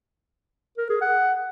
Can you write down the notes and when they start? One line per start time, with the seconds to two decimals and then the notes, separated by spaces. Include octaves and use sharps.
0.78 A#4
0.89 G#4
1.01 F#5